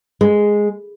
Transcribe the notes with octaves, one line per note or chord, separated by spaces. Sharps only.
G#3